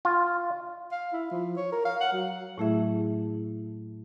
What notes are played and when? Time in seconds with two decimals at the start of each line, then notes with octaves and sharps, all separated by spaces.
0.05 F4
0.92 F5
1.13 E4
1.31 F3
1.57 C#5
1.72 A#4
1.85 F5
2.01 F#5
2.13 F#3
2.58 A2 F#3 A3 E4 G#4 E5